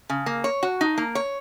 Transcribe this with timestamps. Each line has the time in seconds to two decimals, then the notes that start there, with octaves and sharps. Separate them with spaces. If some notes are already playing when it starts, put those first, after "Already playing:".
0.10 C#3
0.26 A#3
0.44 C#5
0.63 F#4
0.81 D#4
0.98 A#3
1.15 C#5